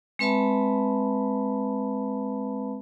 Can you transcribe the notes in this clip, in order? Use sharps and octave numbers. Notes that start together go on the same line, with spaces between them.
G#3 C4 B4 E5 A5 B5